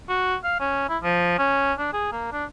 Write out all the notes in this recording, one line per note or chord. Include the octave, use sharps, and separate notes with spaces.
F#4
F5
C#4
E4
F3
C#4
D4
G#4
A#3
D4